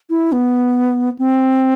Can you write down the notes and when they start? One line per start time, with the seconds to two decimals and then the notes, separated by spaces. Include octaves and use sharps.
0.10 E4
0.32 B3
1.19 C4